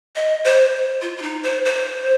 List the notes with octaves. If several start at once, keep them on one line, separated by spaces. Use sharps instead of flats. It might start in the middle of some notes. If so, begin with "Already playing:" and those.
D#5
C5
F4
F4
D#4
C5
C5